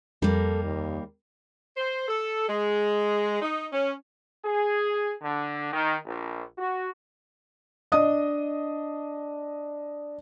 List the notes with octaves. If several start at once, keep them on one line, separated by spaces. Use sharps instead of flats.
F2 G3 A#3 A4
D#2
C5
A4
G#3
D#4
C#4
G#4
D3
D#3
A#1
F#4
D4 D#5 D#6